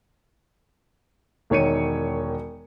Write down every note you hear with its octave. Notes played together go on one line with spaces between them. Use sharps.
E1 D#3 C#5 C#7 D#7